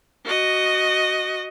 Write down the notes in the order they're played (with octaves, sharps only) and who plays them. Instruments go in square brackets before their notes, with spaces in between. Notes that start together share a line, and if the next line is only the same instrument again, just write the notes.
[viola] F#4 D#5